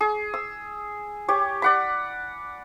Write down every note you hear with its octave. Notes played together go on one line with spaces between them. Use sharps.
G#4
E6
G4 C#5
D5 F#5 B5